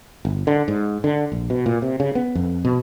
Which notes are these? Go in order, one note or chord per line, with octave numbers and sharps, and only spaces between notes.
G1
D3
G#2
D3
A#1
B2
A#2
C3
C#3
B3
F2
B2